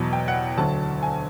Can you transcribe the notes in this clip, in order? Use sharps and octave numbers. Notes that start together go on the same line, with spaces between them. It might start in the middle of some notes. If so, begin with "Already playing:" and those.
Already playing: E2 B2 F#3
G5
F#5
D2 D3 F#3 A5
G#5